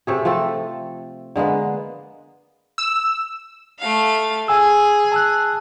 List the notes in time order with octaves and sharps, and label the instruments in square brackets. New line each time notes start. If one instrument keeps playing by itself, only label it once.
[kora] C3 A3 G#4
F3 A3 C4 A4
D3 G#3 A#3 B3
[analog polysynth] E6
[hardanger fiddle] A3 F5
[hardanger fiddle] G#4 [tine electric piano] G#5 E6
[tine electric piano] A5 E6 F#6